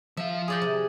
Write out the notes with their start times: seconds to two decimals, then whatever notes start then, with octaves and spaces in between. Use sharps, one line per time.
0.17 F3 E5 F5
0.48 G#4 D5 G5
0.61 C3